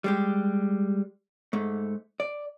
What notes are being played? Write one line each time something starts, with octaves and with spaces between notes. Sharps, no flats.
G3 G#3 G4
G#2 A3
D5